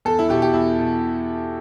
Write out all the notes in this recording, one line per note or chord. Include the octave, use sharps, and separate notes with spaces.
E2 A4
E4
B2 G4
G4
E2 E4
B2